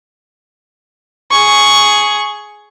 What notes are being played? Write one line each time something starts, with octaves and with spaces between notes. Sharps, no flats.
G#4 C#6